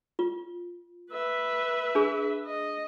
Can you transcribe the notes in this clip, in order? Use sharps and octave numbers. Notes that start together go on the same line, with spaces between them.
F4
B4 E5
D4 G#4
D#5